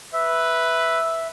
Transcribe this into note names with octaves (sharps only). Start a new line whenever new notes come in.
B4 E5